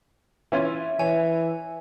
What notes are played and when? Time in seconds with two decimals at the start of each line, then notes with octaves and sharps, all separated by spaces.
0.52 E3 C#4 F4 E5
0.99 E3 C#5 G#5